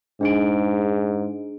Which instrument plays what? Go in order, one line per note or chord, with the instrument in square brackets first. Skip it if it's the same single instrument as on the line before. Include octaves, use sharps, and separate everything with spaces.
[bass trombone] G#2 [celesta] D4 G#4 D7